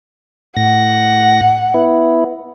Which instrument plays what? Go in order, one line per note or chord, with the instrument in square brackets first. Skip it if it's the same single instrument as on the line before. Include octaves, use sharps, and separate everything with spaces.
[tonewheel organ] A2 A#6 [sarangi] F#5
[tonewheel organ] B3 E4